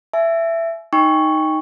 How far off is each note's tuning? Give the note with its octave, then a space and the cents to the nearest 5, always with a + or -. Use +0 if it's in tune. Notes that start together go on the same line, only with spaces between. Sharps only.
E5 +15 G#5 +35
D#4 +0 G5 +25 C#6 +0